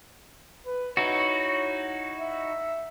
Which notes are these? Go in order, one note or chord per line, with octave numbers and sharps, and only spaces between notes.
B4
D#4 E4 F#4 C#5
E5